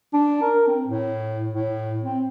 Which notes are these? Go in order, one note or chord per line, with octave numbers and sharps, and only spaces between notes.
D4
A#4
C4
A2
A2
C4